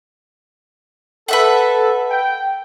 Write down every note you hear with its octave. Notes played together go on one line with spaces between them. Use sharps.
A4 B4 E5 F#5
G5